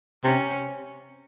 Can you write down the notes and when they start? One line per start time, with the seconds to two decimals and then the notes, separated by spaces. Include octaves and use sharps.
0.24 C3 C#4